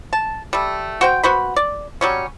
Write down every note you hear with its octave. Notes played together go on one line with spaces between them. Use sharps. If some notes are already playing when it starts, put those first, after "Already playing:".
A5
G3 A3
F#4 C5 G5
B3 F#4 C5 B5
D5
F#3 G3 C#4